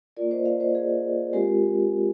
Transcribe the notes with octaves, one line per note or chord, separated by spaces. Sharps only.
A#3 F4 A#4 D5
C5 D#5
D5 F5
C5 D#5
G#4
G#3 C4 F4 G4 A#4